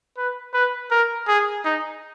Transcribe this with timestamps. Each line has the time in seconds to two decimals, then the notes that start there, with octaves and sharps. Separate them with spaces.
0.17 B4
0.54 B4
0.91 A#4
1.28 G#4
1.65 D#4